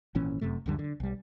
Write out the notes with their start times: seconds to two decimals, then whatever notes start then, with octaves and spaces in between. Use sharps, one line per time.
0.15 G#1 A#2 E3 C#4
0.41 F1 F#2 C3 A3
0.66 C#2 F#2 D3 G3
0.79 D3
1.00 B1 G3